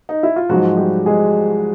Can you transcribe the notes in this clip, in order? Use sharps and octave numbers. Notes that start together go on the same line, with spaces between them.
D#4
E4
F4
G#2 F3 F#3 G#3 F#4
G3 G4
G#3 G#4